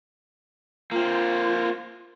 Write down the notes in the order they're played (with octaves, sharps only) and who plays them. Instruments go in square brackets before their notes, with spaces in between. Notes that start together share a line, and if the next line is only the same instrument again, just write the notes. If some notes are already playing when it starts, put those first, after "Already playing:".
[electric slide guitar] A#3 C4 [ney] F4